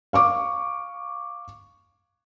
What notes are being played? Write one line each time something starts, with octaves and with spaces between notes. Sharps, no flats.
F5 C#6 D6